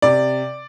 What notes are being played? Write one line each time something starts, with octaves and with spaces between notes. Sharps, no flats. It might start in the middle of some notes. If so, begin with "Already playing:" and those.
C3 D5